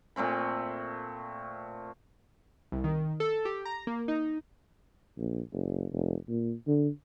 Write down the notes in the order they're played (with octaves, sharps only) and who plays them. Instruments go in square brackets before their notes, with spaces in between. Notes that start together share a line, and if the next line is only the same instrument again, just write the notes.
[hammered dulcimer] A#2 A3 C4 B5
[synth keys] C2
D#3
A4
G4
A#5
A#3
D#4
[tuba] A#1
F#1
F1
A#2
D3